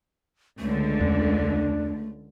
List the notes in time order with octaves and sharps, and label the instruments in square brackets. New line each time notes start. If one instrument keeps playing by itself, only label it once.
[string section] C#2 D3 [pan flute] A3
[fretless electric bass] E2 C#4 [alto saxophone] D4